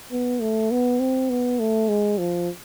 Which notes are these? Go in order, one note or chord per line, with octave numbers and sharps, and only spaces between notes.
B3
A3
B3
C4
B3
A3
G#3
F3